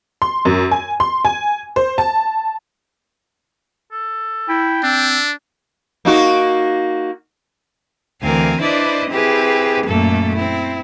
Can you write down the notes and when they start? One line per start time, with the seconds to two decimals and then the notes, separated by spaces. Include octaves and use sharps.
0.22 C6
0.45 F#2
0.71 G#5
1.00 C6
1.25 G#5
1.76 C5
1.98 A5
3.92 A4
4.49 E4 G5
4.83 C4 D4 E5
6.05 A#3 D#4 F#4
8.22 D2 E3 C4 A#4 F5 G#5
8.60 D4 E4 B4 C5 D5 D#5
9.09 C4 E4 G4 G#4 B4
9.85 F#2 A#2 A3 A#3 A4
10.35 C4 E4